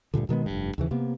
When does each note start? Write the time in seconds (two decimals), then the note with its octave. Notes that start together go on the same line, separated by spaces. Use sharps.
0.14 D2 G2 A#2 D3
0.29 B2 D#3 G#3 B3
0.46 F1 G2
0.78 D#2 C#3 E3
0.91 C3 A#3 B3